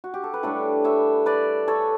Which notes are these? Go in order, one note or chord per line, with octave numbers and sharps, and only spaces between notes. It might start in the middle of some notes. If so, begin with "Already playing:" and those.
F#4
G4
A4
B4
A2 G3 D4 A4 C#5
C#5 E5
B4 D5
A4 C#5